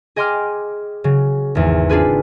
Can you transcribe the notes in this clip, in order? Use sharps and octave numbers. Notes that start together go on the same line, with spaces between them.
G#4 D#5 G5 C6 D6 F6
C#3 F#3
G#1 E2
C4 D4 F4 G#4 B4